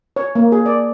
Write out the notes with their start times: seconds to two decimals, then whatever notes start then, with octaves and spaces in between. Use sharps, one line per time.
0.16 C#5
0.35 A#3
0.52 G#4
0.66 D5